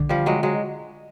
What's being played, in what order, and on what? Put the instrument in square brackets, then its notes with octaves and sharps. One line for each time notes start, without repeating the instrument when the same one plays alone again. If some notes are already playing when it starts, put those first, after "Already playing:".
Already playing: [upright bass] D3
[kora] F3 G3
F#3 G#3
F#3 G#3